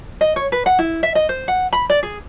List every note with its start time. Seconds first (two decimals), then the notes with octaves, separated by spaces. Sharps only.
0.21 D#5
0.36 C#5
0.52 B4
0.66 F#5
0.79 E4
1.03 E5
1.15 D#5
1.29 C5
1.48 F#5
1.73 B5
1.90 D5
2.03 G#4